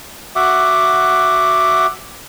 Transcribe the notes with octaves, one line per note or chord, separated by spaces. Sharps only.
F#4 E5 F#5 D6